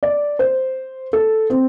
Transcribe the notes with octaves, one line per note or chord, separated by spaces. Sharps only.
D5
C5
A4
C4